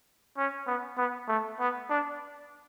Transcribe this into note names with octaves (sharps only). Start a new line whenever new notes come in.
C#4
B3
B3
A3
B3
D4